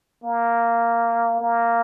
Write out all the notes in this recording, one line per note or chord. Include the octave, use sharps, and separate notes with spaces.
A#3
A#3